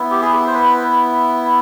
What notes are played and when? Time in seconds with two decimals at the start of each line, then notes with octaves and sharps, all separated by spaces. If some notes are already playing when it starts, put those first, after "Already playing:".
Already playing: B3 E4
0.11 G4
0.22 G#4
0.47 C5
0.54 B4